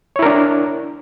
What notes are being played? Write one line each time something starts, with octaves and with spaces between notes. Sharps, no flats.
D4 E4 A#4 C#5